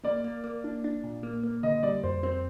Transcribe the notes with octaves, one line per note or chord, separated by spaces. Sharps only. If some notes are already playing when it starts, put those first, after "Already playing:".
A#3 D5
A#3
A#3
D4
D4
A#2
A#3
A#3
D3 D#5
G3 D5
F2 C5
C4 C5